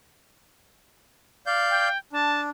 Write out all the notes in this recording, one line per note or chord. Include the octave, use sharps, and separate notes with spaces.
D5 F5 G6
G5
D4 A5